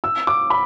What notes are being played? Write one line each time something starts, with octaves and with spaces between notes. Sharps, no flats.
E6
D6
B5